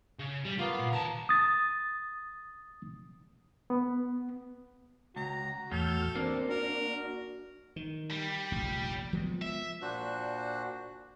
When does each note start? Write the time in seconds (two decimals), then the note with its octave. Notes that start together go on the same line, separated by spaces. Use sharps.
0.19 C#3
0.46 G3
0.60 A#3 B3 F4
0.80 A#2
0.92 D#2 A5 A#5
1.29 D#6 A6
3.70 B3
5.16 C#2 F#4 A#5
5.71 E2 A2 A4 F6 G6
6.15 A#3 C4 D4
6.49 D4 F#4 A#4
7.76 D#3
8.11 G3
8.51 F1 A#1
9.13 F3 G#3 B3
9.42 E5
9.82 A#2 D4 F#4 C5 F#6